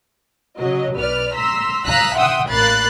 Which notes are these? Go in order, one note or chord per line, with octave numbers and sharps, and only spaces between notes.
C#3 F#3 D#5
B1 B4 D5 F6
A#5 C6 E6 B6
F5 A#5 D#6 E6 F#6 B6
E5 F#5 G5 C6 D#6 E6
A1 A#3 B5 F#6 A6 C7